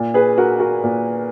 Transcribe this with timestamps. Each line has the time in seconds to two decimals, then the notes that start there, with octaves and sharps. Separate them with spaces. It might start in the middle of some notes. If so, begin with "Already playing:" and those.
Already playing: A#2
0.14 G#4 B4
0.38 F#4 A#4
0.60 F#4 A#4
0.83 A#2